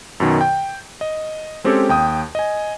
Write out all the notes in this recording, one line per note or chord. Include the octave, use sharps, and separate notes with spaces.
F#2 B2 D#3
G5
D#5
G#3 C4 C#4 G4 A4 C#5
D#2 G5 D#6
D#5 G#5